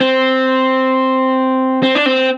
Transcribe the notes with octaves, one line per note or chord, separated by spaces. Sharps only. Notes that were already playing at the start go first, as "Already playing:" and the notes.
C4
C4
D4
C4